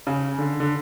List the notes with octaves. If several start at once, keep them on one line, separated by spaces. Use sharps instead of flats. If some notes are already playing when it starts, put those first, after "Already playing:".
C#3
D3
D3